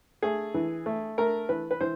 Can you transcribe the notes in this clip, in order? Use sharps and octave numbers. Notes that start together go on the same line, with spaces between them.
A3 G#4
E3
A3
A3 A#4
E3 B4
B4
E3 C5